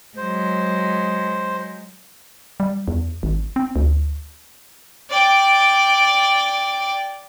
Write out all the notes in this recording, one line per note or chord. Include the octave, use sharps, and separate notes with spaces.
F#3 G#3 C5
G3
E2
G#1
C4
D2
D5 G5